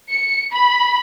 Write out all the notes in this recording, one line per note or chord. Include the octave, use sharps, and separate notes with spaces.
C#7
B5